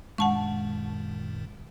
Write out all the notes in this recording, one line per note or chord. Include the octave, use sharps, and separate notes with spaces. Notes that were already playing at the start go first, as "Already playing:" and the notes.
F#2 A#2 D#3 G#3 F#5 A5 C#6